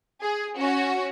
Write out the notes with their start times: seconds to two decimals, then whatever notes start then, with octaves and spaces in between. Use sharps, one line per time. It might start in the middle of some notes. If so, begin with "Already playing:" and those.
0.23 G#4
0.58 C#4 F#4